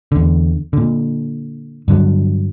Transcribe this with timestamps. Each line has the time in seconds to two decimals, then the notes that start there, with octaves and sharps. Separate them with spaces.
0.12 E2 D3
0.73 A#2 D3
1.88 G2 D3 F#3